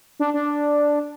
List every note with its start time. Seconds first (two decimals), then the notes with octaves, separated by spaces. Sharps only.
0.20 D4
0.34 D4